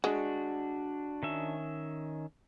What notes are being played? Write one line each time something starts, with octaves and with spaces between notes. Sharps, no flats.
G#3 D4 F#4
D#3 C#4 E5